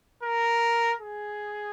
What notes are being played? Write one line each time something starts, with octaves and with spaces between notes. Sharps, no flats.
A#4
G#4